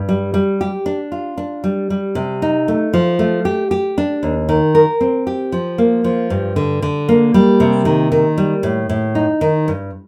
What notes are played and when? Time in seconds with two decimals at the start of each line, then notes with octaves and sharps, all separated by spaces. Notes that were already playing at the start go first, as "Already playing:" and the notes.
Already playing: G2
0.09 G3
0.34 G3
0.61 G4
0.86 D4
1.12 F4
1.38 D4
1.64 G3
1.90 G3
2.15 C3
2.42 D#4
2.68 A3
2.94 F3
3.19 A3
3.45 G4
3.71 G4
3.98 D4
4.23 D#2
4.49 D#3
4.75 A#4
5.01 C4
5.27 G4
5.52 F3
5.78 A#3
6.04 F3
6.30 G2
6.56 D3
6.82 D3
7.09 A#3
7.34 G3
7.60 C3
7.85 D#3
8.12 D#3
8.38 G3
8.63 A2
8.89 A2
9.15 D#4
9.41 D#3
9.68 G2